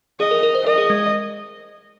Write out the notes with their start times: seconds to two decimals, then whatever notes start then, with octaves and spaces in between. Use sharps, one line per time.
0.20 G#4 D#5
0.31 A#4
0.43 A#4
0.55 C5
0.66 A#4 D#5
0.78 G#4
0.90 G#3